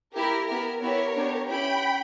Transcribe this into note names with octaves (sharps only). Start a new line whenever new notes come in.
A#3 E4 G4 A#4
B3 E4 G4 A#4
B3 E4 G4 A#4 C#5
B3 D4 G4
C#4 E4 G4 G5 B5